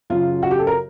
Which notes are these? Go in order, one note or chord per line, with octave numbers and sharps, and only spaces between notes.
F#2 C#3 F#3 F4
F#4
G4
A4
A#4